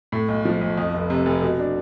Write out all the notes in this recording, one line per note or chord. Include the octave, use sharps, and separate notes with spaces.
A2
B1
F3
B1
F2
F1
C3
F1
B2
D4